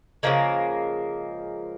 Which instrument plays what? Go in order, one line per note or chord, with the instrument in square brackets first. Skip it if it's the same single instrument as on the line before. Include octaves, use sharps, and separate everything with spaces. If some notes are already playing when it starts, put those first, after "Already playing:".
[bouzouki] C#3 F3 G#3 A#3